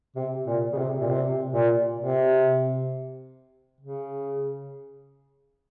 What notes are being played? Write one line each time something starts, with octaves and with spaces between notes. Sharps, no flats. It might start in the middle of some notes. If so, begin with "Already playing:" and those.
C3
A#2
C#3
C3
A#2
C3
A#2
C3
C#3